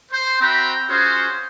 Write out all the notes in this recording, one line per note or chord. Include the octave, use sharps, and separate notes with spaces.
C5
C4 F#4 E5 G5 A#5 B5
C#4 F4 F#4 G#4 C5